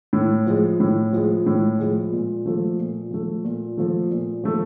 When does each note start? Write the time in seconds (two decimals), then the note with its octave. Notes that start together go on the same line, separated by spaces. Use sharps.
0.13 A2
0.47 F3 G#3
0.80 A2
1.13 F3 G#3
1.46 A2
1.79 F3 G#3
2.12 A#2
2.46 F3 A3
2.79 A#2
3.11 F3 A3
3.44 A#2
3.77 F3 A3
4.11 A#2
4.44 F3 A3